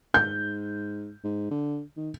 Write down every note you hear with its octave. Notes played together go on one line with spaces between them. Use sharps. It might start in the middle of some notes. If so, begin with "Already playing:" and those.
G#2 G6
G#2
D3
D#3